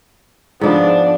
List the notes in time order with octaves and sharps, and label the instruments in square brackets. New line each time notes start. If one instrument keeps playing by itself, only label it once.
[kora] G#2 F3 B3 [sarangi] D4